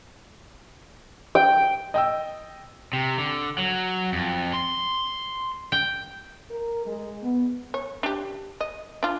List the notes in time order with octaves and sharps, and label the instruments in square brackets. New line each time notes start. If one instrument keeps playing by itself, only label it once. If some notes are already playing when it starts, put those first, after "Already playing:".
[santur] G5
[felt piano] D#5 G5 E6
[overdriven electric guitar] C3
D3
F#3
F2
C6
[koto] G5
[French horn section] A#4
G#3
B3
[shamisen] C#5
D4 G4
D#5
D4 F4